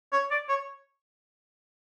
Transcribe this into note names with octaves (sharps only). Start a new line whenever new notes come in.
C#5
D5
C#5